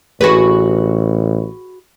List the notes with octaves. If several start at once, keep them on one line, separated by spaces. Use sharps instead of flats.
A1 F#4 G#4 B4